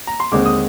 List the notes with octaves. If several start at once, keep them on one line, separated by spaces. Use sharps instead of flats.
A#5
C6
D#2 D3 G#3 C4 D6
D#6